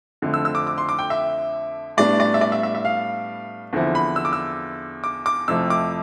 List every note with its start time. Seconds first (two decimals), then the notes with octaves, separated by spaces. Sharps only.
0.22 F2 D3 F3 A3 C4
0.34 E6
0.45 E6
0.55 D6
0.67 D6
0.78 C6
0.89 D6
0.99 G5
1.10 E5
1.97 A2 G3 B3 D4 D5
2.20 D5
2.34 E5
2.41 D5
2.52 E5
2.63 E5
2.75 E5
2.85 F5
3.73 E2 D3 F3 C4 E4
3.95 B5
4.16 E6
4.25 D6
4.33 E6
5.04 D6
5.26 D6
5.48 F2 C3 F3 A3 E4 E6
5.70 D6